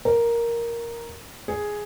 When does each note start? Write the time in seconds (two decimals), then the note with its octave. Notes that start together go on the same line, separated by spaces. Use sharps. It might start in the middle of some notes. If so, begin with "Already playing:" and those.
0.05 A#4
1.48 G#4